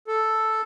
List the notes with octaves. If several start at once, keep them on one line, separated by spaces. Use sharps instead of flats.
A4